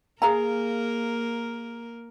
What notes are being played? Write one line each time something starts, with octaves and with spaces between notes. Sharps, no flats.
A#3 G#4 A#4 F5 A#5